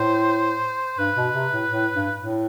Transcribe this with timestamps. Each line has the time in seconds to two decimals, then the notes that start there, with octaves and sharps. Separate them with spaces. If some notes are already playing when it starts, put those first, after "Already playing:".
Already playing: A2 C5
0.98 G2 B4
1.16 B2
1.34 C3
1.52 A2
1.69 A2
1.93 G2
2.17 A2